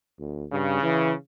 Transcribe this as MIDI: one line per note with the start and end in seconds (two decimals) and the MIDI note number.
0.19 0.44 38
0.52 0.80 43
0.52 1.14 49
0.82 1.12 52